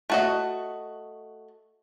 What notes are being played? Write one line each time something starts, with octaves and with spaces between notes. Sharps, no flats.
A3 F#4 D#5